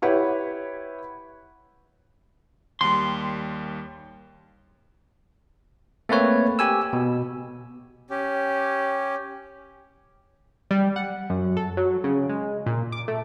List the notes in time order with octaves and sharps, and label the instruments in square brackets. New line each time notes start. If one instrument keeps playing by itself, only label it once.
[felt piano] E4 G4 B4 C#5 F#5 B5
[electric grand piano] D#2 G3 [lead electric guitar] C6
[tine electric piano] A3 A#3 C4 B4 C#5
G4 G#5 E6
B2
[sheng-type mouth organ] C#4 G4
[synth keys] G3
F#5
F#2
A4
F#3
C#3
G#3
A#2
D6
A3